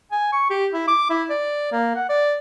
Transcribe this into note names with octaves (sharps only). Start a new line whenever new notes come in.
G#5
C#6
G4
E4
D6
E4
D5
A#3
F#5
D5